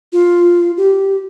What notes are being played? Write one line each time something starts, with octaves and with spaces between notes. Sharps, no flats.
F4
G4